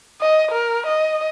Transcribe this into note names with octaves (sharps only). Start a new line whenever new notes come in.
D#5
A#4
D#5